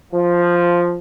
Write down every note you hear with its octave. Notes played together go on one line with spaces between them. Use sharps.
F3